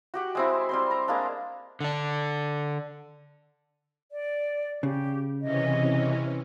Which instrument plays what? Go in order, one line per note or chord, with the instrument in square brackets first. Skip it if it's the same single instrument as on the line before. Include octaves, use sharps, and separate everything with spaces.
[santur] F#4 G4 F#5
G#3 C4 E4
G3 C4 C6
A#5
G#3 A#3 D4
[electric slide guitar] D3 D4
[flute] D5
[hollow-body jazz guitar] C#3 [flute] G4
[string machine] C3 E3 C#4 [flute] D#5